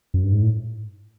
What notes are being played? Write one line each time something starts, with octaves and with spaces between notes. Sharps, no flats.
F#2
G2
G#2
A2